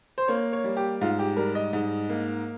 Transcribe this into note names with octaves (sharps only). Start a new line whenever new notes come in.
C5
A#3 C#5
C#5
G3
G4
G#2 F4
G4
G3 A#4
D#5
G#2
A#3